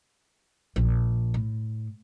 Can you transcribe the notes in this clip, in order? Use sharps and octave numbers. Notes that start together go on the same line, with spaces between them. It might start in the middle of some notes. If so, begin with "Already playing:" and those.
A#1
A2